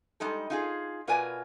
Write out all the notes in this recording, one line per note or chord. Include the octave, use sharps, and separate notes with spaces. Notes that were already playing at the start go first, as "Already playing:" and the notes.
G3 G#3 D#4 A4
D#4 F4 G#4
B2 F4 A#4 B4 D5 G#5